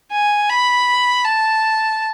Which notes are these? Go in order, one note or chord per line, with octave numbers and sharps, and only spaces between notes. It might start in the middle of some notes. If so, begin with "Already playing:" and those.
G#5
B5
A5